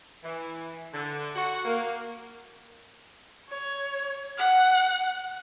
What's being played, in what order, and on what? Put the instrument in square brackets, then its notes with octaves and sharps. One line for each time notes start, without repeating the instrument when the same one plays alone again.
[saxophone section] E3
D3
F#4
A#3
[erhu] C#5
F#5